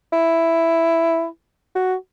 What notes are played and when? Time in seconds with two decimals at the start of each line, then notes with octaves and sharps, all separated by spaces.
0.13 E4
1.75 F#4